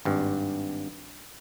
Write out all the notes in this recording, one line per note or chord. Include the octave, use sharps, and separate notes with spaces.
G#1 G2